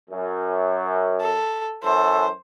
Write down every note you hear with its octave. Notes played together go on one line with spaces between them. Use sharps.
F#2
A4
F#2 E3 A4 C5